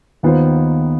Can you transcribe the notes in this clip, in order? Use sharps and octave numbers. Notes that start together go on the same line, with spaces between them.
D#2 D#3 B3 F4 C5